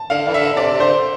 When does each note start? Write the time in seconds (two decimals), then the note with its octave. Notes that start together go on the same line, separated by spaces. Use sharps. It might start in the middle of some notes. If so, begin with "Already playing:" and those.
Already playing: A5
0.10 D3 F5
0.27 E3 F5
0.34 D3 E5
0.56 C3 D5
0.73 C3
0.80 D3 C5